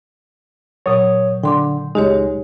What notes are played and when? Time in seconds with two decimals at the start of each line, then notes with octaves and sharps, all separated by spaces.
0.86 A#2 F#3 C#5 D#6
1.43 D3 G5 C6 D6
1.95 C#2 G#3 D#4 G4 C#5